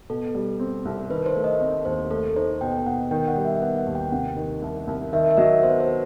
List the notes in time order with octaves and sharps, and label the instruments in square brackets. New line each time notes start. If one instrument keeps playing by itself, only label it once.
[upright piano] B2 [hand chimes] A4
[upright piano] G3
C4
C2
[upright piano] D#3 [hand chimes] B4
[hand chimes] C5
[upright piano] A3
[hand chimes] D#5
[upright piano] C4
[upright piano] D#2 [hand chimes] C5
[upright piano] A3 [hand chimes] A4
[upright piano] D#4 [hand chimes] C5
[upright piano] B2 [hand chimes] G5
[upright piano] B2 [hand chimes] F#5
[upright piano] D#3 [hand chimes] G5
[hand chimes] F#5
[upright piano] G3
[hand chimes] E5
[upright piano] B3 [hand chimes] F#5
[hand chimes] F#5
[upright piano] D#2
[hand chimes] G5
[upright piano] C3 [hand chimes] F#5
[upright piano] D#3
C2
C2
[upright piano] D#3 [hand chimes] E5
[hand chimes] E5
[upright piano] F#3 [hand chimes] D#5
[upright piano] B3 [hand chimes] C5
[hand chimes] C5